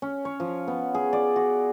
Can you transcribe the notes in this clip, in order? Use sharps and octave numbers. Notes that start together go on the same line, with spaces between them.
C#4
C#5
F3
B3
G#4
D5
F#4